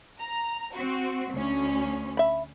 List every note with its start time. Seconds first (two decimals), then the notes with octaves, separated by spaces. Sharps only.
0.20 A#5
0.74 C4 F#4
1.32 D2 C#4
2.17 E5 B5